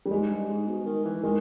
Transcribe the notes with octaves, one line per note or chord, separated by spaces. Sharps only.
G3
G#2 G#3
G2
G#2
B2
D#3
E3
D#3 G#3